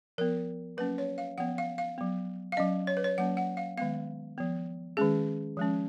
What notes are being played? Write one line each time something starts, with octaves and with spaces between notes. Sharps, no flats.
F3 B3 A#4
F#3 A#3 C#4 B4
C#5
F5
F3 B3 F#5
F5
F5
F#3 B3
F5
F#3 C#4 D#5
C#5
B4
C#5
F#3 A#3 C#4 F#5
F#5
F5
D#3 G#3 B3 F5
F3 B3
D#3 G#3 C#4 G#4
F3 G#3 C#4